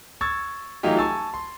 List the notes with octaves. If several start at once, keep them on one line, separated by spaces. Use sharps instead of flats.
C#6 E6 G#6 A6
E3 F#3 A3 D#4 F4 G4
G#5 A5 C#6 E6 A6
C6